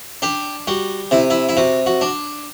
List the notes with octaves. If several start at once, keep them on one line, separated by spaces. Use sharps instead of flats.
D4 G4
G3 F#4
C3 E4
E4
E4
C3 F#4
F#4
D4